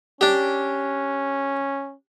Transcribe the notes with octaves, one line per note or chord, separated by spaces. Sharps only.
C#4 D4 G4